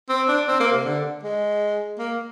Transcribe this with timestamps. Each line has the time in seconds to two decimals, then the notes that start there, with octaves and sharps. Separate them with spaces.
0.09 C4
0.28 D4
0.47 C4
0.60 A#3
0.72 C3
0.85 D3
1.23 G#3
1.99 A#3